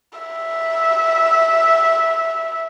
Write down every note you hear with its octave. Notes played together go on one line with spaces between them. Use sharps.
E5